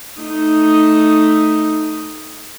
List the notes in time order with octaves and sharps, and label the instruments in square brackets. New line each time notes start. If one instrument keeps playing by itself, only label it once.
[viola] A3 D#4